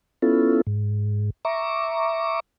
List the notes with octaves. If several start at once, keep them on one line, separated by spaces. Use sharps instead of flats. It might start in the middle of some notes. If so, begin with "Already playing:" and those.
B3 C#4 E4 F4 A4
G#2
E5 A#5 C#6 D6